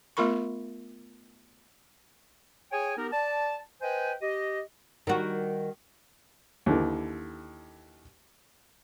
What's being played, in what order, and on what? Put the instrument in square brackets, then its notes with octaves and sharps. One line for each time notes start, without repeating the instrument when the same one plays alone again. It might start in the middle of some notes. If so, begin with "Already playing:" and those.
[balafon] A3 B3 F4 A#4 B5 C#6
[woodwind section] G#4 C#5 G5 G#5
B3 D#4 G4 A#4
D5 A5
B4 C5 D#5 G5 G#5
G4 D#5
[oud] D#3 G3 F#4
[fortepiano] D#2 D3 E3